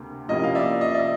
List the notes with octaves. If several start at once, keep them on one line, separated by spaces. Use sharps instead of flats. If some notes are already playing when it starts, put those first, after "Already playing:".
Already playing: D2 C3 A#3
C3 F3 A#3 C#4 E4 D#5
F5
D5 E5
D#5
D5 E5